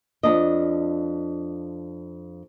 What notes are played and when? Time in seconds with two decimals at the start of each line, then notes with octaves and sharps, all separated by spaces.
0.23 F2 D4 D#5